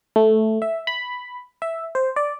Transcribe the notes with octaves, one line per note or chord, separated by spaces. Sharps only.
A3
E5
B5
E5
C5
D5